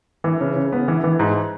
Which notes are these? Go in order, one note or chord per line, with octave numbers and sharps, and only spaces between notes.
E3
C#3
C#3
B3
E3
E3
G#2